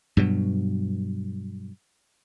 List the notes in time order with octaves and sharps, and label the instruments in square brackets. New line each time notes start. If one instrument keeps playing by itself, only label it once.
[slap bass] G2 B2 F#3